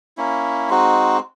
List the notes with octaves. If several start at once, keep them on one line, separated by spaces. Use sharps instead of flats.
A#3 C#4 E4
G#3 C4 D#4 F#4